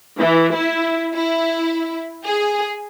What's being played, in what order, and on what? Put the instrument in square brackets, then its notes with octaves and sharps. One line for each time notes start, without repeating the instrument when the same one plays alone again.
[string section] E3
E4
E4
G#4